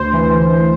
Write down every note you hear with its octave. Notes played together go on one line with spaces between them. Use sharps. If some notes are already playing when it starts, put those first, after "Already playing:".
Already playing: D2 C5
E3
D2